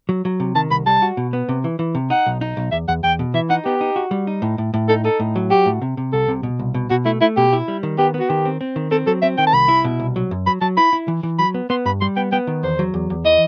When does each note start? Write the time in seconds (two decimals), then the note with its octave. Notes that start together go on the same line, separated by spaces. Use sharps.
0.09 F#3
0.25 F#3
0.40 C3
0.55 D#3 A5
0.70 C2 B5
0.86 G3 A5
1.02 F#4
1.17 B2
1.33 B3
1.49 C3
1.64 E3
1.79 E3
1.95 C3
2.10 D#4 F#5
2.26 B1
2.41 D#4
2.57 B1
2.72 E2 E5
2.88 E2 F#5
3.03 E2 G5
3.19 B2
3.34 E3 E5
3.50 D#4 F#5
3.65 B3 G4
3.81 D#4
3.96 F#4
4.11 G3
4.27 D#4
4.42 A2
4.58 A2
4.74 A2
4.89 D#4 A4
5.05 D#4 A4
5.20 A2
5.36 F#3
5.50 F#4 G4
5.66 A2
5.82 C3
5.97 C3
6.13 C2 A4
6.28 C3
6.43 B2
6.59 C2
6.74 B2
6.90 B2 F#4
7.05 A3 E4
7.21 A3 E4
7.37 B2 G4
7.53 E4
7.68 G3
7.83 D#3
7.98 B3 G4
8.14 B3
8.20 F#4
8.30 D#3 G4
8.45 C4
8.61 C4
8.76 D#3
8.91 C4 A4
9.07 F#3 A4
9.22 C4 E5
9.38 D#3 G5
9.47 A5
9.53 C2 B5
9.68 E4
9.84 B2
10.00 C2
10.16 F#3
10.31 F#2
10.47 F#3 B5
10.61 F#3 A5
10.77 E4 B5
10.93 E4
11.08 E3
11.23 E3
11.39 F#3 B5
11.54 B3
11.70 B3 C6
11.85 G2 B5
12.01 G3 C6
12.16 B3 G5
12.32 B3 G5
12.47 D#3
12.63 E2 C5
12.79 F#3
12.94 E2
13.10 E2
13.24 E3 D#5